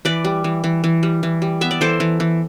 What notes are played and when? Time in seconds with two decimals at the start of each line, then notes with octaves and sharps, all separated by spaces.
0.05 E3 B4 D5
0.25 G3
0.44 E3
0.64 E3
0.84 E3
1.03 G3
1.23 E3
1.42 G3
1.61 B3 E5
1.71 D5
1.81 E3 A4 C5
2.00 E3
2.20 E3